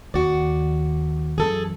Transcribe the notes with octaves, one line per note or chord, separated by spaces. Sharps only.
D#2 F#4 D5
F#2 E3 G#4 A4